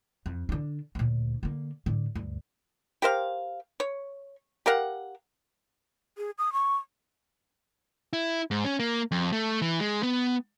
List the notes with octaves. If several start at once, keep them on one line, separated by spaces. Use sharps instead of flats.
F2
D3 D4
D2 A#2
D3 A#3
A2 D3
D2 G2
G4 A#4 C5 F5
C#5
G4 A#4 F5 F#5
G#4
D#6
C#6
E4
G#2
C#4
A#3
F2
A3
E3
G#3
B3